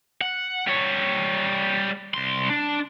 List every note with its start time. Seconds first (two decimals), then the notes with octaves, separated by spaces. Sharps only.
0.21 F#5
0.68 G3 C#5
2.14 C2 C6
2.50 D4